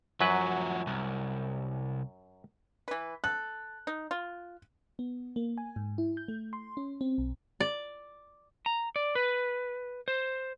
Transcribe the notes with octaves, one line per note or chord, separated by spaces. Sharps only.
F#2 F3 F#3 F#4 B4
C2
E3 B4
A4 F#6
D#4
F4
B3
A#3
G#5
G#2
E4
G6
A3
C6
C#4
C4
B1
D5
A#5
D5
B4
C5